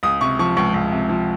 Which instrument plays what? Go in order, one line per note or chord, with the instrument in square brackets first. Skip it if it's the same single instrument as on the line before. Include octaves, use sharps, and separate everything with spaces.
[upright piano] C#2 D#6
C3 C#6
F3 C#6
C#2 C#6
C#2
C3
F3